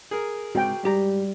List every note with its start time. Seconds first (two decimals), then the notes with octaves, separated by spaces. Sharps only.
0.11 G#4 A#4
0.55 C#2 G#2 C3 F#4 G5
0.84 G#2 G3 G4 A#5